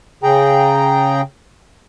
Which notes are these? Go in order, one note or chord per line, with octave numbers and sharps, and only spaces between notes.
C#3 G#4 G5 A#5